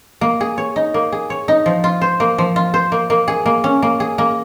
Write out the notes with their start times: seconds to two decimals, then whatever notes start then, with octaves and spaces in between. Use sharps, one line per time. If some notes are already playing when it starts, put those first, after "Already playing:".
0.21 A#3
0.41 G#4
0.58 C#5
0.76 D#4
0.94 A#3
1.12 G#4
1.30 C#5
1.48 D#4
1.66 F3
1.84 F4
2.01 C5
2.20 A#3
2.38 F3
2.56 F4
2.74 C5
2.92 A#3
3.10 A#3
3.28 G#4
3.46 A#3
3.64 C#4
3.82 A#3
4.00 G#4
4.18 A#3